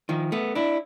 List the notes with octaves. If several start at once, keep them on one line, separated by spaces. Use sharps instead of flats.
D#3 F3
A3 B3
D4 E4